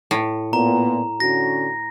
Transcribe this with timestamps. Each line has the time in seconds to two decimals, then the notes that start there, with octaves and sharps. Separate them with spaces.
0.11 A2
0.53 A#2 B3 A#5
1.20 D3 C#4 F#4 A#6